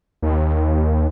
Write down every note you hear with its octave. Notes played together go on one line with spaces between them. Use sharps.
D#2